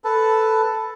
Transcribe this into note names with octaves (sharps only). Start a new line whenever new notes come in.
A4 B4 A5